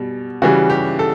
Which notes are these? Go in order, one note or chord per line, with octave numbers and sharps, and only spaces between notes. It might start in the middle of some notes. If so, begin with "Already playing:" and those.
Already playing: B2 G3
C#3 E3 G3 F#4
G4
A4